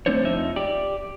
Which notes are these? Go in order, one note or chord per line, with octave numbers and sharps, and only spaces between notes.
A3 C4 D4 C5 C#5
F2 F3 D#4 E5
G4 D5